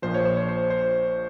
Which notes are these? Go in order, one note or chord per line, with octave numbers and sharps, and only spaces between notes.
A#1 A#2 F3 C5
C#5
C5
C#5
C5
C5